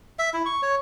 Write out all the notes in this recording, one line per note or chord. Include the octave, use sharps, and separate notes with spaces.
E5
E4
C#6
C#5